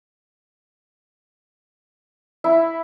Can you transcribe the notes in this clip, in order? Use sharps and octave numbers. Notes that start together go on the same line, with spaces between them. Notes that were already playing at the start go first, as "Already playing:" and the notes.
E4